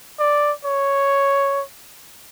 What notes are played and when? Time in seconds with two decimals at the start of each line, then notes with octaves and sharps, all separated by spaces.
0.19 D5
0.65 C#5